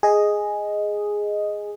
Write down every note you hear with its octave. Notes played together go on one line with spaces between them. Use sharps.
G#4 D#5